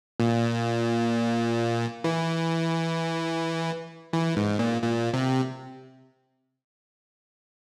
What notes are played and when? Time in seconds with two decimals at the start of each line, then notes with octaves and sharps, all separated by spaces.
0.20 A#2
2.04 E3
4.13 E3
4.36 G#2
4.59 A#2
4.82 A#2
5.13 C3